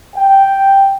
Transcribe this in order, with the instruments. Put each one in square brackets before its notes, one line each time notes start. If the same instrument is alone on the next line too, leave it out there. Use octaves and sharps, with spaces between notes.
[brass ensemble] G5